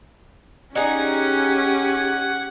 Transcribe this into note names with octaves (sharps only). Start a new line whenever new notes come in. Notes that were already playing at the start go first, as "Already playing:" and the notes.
C#4 D#4 G4 G#4 F#5 F#6 G#6